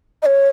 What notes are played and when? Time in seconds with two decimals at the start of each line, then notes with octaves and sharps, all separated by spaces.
0.22 D#5
0.26 C#5